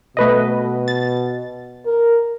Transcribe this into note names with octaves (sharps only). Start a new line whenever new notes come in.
B2 A3 B4 D#5
A6
A#4